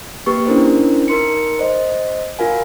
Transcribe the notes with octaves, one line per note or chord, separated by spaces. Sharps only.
A#3 G4 B4 C#6
C#4 D4 E4 A#4 C5
D#4 A#4 C6 C#7
C5 D#5
F4 F#4 A#4 F5 G#5